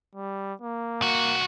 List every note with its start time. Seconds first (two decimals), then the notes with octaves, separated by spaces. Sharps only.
0.15 G3
0.62 A#3
1.01 C2 F#4